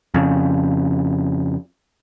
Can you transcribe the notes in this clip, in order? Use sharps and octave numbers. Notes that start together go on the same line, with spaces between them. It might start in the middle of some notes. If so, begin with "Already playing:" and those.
F2 C#3